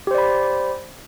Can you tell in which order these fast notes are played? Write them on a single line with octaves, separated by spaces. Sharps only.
G4 C5 D5 B5